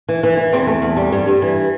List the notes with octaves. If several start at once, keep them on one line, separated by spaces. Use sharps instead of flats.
E3
E3
E3
E2 C4
A3
E2
G3
G2
G2
E3